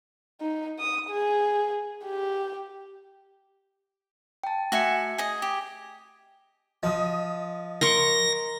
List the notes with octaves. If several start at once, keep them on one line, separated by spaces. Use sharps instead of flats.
D#4
D#6
G#4
G4
G5 A5
A3 F#4 E5 G#5 C#7
G#4 D#5 G#6
G4
F3 D#5 D#6
A#4 C6 C#6 A#6